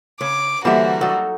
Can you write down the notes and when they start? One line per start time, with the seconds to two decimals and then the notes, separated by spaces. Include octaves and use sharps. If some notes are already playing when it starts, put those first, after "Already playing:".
0.21 C#3 C#5 D6
0.65 D3 E3 G3 A#3 F#4 C5 E5
1.01 F#3 D#4 A4